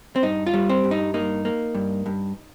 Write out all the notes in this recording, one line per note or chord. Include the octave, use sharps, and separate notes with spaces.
C4
G2 D#4
F4
G3
C4
G2
D#4
A#3 D#4
A#3
G2
G2